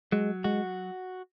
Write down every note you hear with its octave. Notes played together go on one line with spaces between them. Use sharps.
F#3 G#3
G#3 F#4